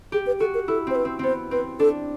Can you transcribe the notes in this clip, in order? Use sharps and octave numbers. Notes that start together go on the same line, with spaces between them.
G4 G#4
B4
F#4 A4
A#4
E4 A4
C4 C5
B4
C4
B3 C4 C5
C4 B4
D4 A4